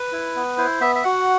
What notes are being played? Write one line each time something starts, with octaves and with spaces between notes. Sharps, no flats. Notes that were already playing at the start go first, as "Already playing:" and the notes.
Already playing: B4
E4
B3
E4 C5
B3 E5
E5
F#4 F#5